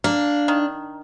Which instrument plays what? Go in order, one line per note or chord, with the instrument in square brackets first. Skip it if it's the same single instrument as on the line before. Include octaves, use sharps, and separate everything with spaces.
[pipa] A#3 [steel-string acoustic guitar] D4
[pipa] D#3